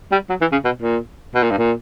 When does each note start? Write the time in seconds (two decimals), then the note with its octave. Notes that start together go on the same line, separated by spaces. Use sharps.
0.12 G3
0.29 F#3
0.41 E3
0.52 C#3
0.65 B2
0.82 A#2
1.35 B2
1.43 A#2
1.51 G2
1.58 A#2